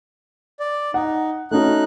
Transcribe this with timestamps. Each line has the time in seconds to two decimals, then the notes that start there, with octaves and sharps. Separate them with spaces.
0.60 D5
0.94 D#4 F#5
1.51 A3 C#4 D#4 F#4 F#6